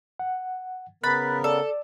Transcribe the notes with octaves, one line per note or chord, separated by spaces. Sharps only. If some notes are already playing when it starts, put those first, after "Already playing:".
F#5
C#3 B3 A#4 B5 F#6 A6
A4 D5